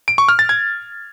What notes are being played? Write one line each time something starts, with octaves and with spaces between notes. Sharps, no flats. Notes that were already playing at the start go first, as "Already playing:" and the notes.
D7
C#6
F6
A6
G#6